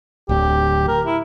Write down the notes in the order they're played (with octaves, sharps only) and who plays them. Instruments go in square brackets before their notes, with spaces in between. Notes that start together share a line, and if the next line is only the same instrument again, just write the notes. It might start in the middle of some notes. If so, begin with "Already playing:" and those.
[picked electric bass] D1 D2 [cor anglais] G4
[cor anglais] A#4
E4